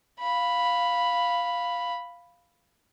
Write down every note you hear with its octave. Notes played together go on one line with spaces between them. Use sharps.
F5 B5